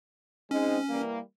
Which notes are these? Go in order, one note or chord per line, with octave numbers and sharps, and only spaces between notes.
G#3 C4 C#4 D#4
E3 G3 A#3